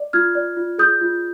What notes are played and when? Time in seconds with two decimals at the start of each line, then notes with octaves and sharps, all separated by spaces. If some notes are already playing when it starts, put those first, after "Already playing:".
Already playing: D5
0.13 F4 F6 G#6
0.35 D5
0.57 F4
0.78 G#4 D#6 G6
1.01 F4